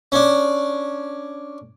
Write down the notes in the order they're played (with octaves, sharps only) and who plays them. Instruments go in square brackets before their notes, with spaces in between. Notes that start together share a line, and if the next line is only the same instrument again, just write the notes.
[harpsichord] C#4 D4